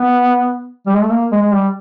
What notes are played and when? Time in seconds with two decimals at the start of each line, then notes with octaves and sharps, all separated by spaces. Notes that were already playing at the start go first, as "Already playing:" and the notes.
Already playing: B3
0.87 G3
0.95 G#3
1.03 A3
1.11 A#3
1.32 G#3
1.42 G#3
1.53 G3